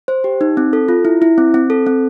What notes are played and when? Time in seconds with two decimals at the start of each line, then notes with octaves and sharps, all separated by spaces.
0.08 C5
0.24 G4
0.41 D#4
0.57 C4
0.73 A4
0.88 F4
1.05 E4
1.22 E4
1.38 C4
1.54 C4
1.70 A4
1.86 C4